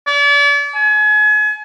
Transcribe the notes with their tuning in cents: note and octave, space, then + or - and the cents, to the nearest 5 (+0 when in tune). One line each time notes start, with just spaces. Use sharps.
D5 -40
G#5 +35